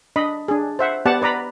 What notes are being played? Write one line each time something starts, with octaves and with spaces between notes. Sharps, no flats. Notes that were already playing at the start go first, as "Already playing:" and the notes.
D4 D#5 B5
D4 G#4
C5 E5 F#5
B3 G4 D5 F#5 A5
B4 D5 A#5 B5